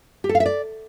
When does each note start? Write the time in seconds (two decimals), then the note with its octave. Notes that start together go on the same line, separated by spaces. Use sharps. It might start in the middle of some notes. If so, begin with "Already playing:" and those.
0.24 G4
0.29 A4
0.35 F5
0.40 E5
0.46 D5